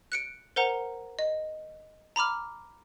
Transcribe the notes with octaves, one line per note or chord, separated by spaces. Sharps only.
F#6 C#7 D7
A#4 C5 F#5 A#5
D#5
A#5 B5 D6 F6